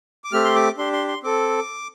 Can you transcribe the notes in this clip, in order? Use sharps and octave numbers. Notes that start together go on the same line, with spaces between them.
D6
A3 C4 G4 F6
C6
D6
D4 G4 C6
C6
C6
C4 A4 D6